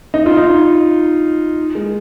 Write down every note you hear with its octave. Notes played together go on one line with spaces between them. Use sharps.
D#4
F4
D#4
G#3